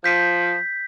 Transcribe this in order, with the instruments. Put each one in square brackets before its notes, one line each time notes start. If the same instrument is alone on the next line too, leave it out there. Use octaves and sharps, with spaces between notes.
[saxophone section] F3 [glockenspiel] G6 B6